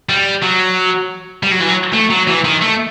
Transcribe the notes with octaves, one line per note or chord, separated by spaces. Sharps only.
G3
F#3
G3
F#3
E3
F#3
A3
F#3
E3
D#3
A3